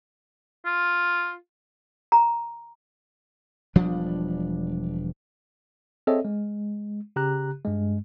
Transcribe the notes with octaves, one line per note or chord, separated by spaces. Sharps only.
F4
A#5
E1 F3 G3 D4
C4 G#4 A4 C#5 D#5 E5
G#3
C#3 G4 A#5 F#6
G2 G#3